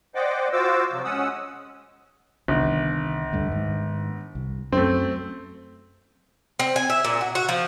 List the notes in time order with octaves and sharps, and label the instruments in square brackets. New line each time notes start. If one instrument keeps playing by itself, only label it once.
[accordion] C5 D5 D#5 F#5 G5 D6
F4 F#4 C5 D6 E6
C3 F3 F#3
G#3 C#4 F#5 D#6 E6
[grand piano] G1 [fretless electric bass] C2 D#3
[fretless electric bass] D2 G2 D3
G#2 D#3
C2
[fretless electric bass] F#2 [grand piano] A3 C4
[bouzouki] C4
G#5
E5
A#2
F#4
F#4
F3